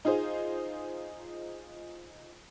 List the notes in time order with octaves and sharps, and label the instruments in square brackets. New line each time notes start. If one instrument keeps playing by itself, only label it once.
[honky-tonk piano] D#4 F4 G#4 C5